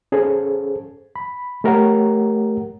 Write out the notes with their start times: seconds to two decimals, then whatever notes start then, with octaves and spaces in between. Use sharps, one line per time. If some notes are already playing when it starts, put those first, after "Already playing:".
0.12 C#4 G#4 A4 C5
1.16 B5
1.64 A3 G4 A#4 C#5 F#5 A#5